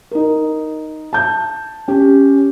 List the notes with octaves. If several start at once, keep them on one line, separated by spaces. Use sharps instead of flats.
D#4 A#4
A5 G6
C#4 G4